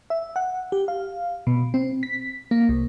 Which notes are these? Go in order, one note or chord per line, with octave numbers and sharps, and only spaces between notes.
E5
F#5
G4
F5
B2
C4
B6
A#3
C2